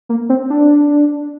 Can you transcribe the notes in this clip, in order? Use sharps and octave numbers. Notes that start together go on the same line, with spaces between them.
A#3
C4
D4